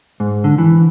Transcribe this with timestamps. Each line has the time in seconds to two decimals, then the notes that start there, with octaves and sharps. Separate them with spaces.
0.20 G#2
0.44 D3
0.58 E3